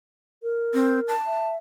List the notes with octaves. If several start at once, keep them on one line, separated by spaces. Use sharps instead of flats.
A#4
C4
A5
E5